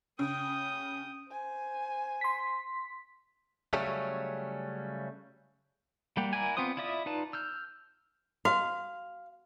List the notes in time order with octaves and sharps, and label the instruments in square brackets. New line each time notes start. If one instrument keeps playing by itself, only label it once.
[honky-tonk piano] C#3 [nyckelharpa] G5 D#6
[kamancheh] C5 G#5
[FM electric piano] C6 B6
[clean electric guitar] C#3 F#3 G3 A3 C#4
[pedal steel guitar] G3 A#3 G4 F#5
E4 A#4 D5 F#5 G#5
B3 C4 F4 C5 D#6
E4 F4 D5 E5 D#6
D#4 F4 B4 D5 A5
E6 F6 G6
[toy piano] F#4 [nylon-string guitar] F5